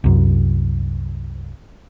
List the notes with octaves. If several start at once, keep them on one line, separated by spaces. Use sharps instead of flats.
C2 F#2